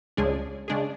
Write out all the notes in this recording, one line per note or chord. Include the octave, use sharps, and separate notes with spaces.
C#2 C#3 G#3 D4 G#4
C#3 G#3 D4 G#4